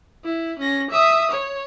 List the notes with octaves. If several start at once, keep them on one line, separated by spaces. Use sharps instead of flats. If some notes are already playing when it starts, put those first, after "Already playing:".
E4
C#4 A#6
E5 D#6
C#5